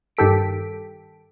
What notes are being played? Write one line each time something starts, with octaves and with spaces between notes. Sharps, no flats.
G2 D#3 G4 A4 B6 D7